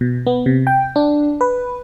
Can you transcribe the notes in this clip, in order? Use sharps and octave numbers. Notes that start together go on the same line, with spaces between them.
B2
B3
C3
G5
D4
B4